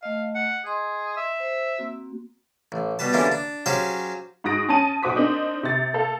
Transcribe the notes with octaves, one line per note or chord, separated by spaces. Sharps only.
A3 D#5 F5
F#5
G#4 D#5 C6
E5
C5
A#3 C4 F#4
A1
B2 G3 B4 A5
D3 E3 G3 A#3 C#4 D4
D4
F#3 C#4 G4 G#4 C5 F5
G#2 F#4 D#6 A#6 D7
C#4 A5 D#7
B1 F#4 C5 D6 D#6 B6
A#3 C4 D4 D#4
C3 A6
A#3 A4 F5